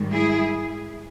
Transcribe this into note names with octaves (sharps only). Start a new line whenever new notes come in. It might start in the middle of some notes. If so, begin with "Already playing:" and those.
Already playing: G#2 D#3 G3
E4 G#4